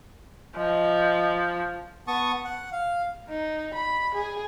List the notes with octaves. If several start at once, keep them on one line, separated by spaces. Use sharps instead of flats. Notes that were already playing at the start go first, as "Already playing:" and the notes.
F3 D#5
B3 A5 C#6 D#6
F#5
F5
D#4
B5
G#4